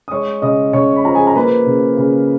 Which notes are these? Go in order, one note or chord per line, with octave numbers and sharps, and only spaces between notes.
D#6
G#3 C#5 C#6
C#3 D#5 D#6
C#3 C#5 C#6
B5
F3 A#5
G#4 G#5
A#5
A#3 B4 B5
C#3
C#3